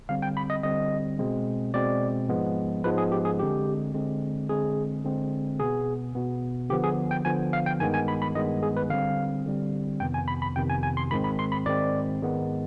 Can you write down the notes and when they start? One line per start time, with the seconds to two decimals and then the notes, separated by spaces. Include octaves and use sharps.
0.09 D3 G3 C4 F5
0.22 G5
0.37 B5
0.50 D#5
0.63 D3 G3 C4 D#5
1.19 B2 G#3 C4
1.74 B2 G#3 C4 D5
2.29 G#2 F3 G#3 B3
2.84 G#2 F3 G#3 B3 B4
2.98 G#4
3.12 G4
3.25 G#4
3.39 D3 G#3 C4 G4
3.94 D3 G#3 C4
4.49 D3 G#3 C4 G#4
5.05 D3 G#3 C4
5.60 B2 B3 G#4
6.15 B2 B3
6.69 D3 F3 B3 G4
6.84 G#4
7.11 G5
7.25 D3 F3 B3 G#5
7.53 F5
7.66 G5
7.80 G2 D#3 G#3 B3 G#5
7.94 G#5
8.08 B5
8.22 B5
8.35 G2 D#3 G#3 B3 D#5
8.63 G#4
8.77 B4
8.90 D3 G3 C4 F5
9.45 D3 G3 C4
10.00 F2 C3 D#3 B3 G5
10.14 G#5
10.28 B5
10.42 B5
10.56 F2 C3 D#3 B3 G5
10.70 G#5
10.83 G#5
10.97 C6
11.11 G#2 D#3 G#3 C4 B5
11.24 B5
11.39 C6
11.52 B5
11.66 G#2 D#3 G#3 C4 D5
12.21 G#2 D#3 G#3 B3